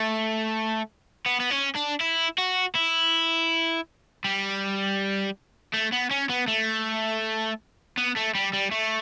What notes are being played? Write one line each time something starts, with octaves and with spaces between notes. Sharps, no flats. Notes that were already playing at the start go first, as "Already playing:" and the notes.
Already playing: A3
B3
B3
C#4
D4
E4
F#4
E4
G3
A3
B3
C#4
B3
A3
B3
A3
G3
G3
A3